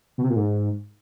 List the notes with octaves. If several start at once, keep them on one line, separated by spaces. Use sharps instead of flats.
B2
C3
A#2
G#2